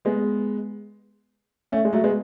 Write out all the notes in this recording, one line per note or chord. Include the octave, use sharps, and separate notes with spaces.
G#3 B3
A3 C#4
G#3
F#3 A3
G#3 B3